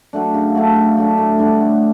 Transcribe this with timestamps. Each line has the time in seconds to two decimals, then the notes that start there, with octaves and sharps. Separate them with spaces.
0.13 F#3 A3 D4
0.34 C#3
0.55 F#3 A3 D4
0.76 C#3
0.97 F#3 A3 D4
1.18 A2
1.39 G3 D4 F#4
1.60 A2